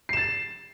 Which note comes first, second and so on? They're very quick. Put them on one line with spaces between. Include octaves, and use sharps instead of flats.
C7 E7 A6